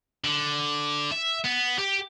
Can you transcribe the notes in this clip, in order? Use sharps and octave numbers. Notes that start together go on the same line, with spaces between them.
D3
E5
B3
G4